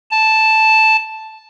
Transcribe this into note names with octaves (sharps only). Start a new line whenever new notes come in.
A5